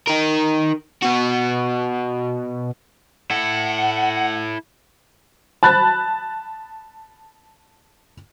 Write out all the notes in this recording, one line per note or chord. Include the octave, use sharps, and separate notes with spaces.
D#4 A#4
B2 F#4
E4 A4 F#5
A5 B5 F#6 A6